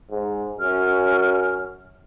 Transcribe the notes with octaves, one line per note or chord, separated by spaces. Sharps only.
G#2
F#2 C#4 F6